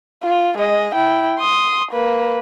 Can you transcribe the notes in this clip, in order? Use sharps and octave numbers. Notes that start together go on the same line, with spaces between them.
F4
G#3 D#5
E4 G5
C6 D#6
A#3 B4